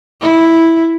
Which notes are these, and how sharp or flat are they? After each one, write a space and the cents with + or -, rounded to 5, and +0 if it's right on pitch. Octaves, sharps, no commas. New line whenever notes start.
E4 -5